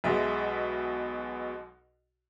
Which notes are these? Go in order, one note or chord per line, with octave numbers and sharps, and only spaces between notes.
B1 B2 G#3 E5